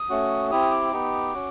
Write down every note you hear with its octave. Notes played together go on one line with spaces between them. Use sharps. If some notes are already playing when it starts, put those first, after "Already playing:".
Already playing: D#6
A3 C#4 F#4
C4 E4 G4 D#6
D6
B3 D#4 G4
C#4 F#4